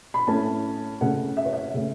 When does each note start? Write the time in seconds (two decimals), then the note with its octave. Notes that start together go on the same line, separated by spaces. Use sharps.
0.14 B5
0.27 A2 A3 C#4 A5
1.01 C#3 A3 C#4 F#5
1.37 E5
1.45 C#5
1.53 E5
1.74 C#3 A3 C#4